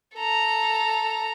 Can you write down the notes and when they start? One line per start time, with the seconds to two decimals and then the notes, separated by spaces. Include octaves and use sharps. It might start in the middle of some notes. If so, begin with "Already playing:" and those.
0.16 A4 A#5